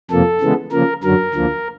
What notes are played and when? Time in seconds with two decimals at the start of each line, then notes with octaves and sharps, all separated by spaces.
0.10 F2 C3 F3 A#3 A4
0.41 C#3 E3 G#3 B3
0.72 C#3 F3 A#3 A#4
1.03 F#2 D3 F#3 A#4
1.34 D2 D3 F3 A#3